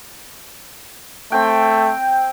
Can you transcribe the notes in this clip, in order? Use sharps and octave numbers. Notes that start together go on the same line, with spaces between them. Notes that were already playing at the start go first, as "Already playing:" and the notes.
A3 C4 G5